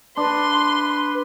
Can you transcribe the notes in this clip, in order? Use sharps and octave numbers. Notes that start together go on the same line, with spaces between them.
D4 B4 C6